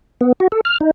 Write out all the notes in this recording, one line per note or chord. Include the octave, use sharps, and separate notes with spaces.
B3
F#4
A4
F6
D#4